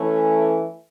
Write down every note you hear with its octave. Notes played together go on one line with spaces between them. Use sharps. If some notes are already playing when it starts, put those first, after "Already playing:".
Already playing: E3 A3 C#4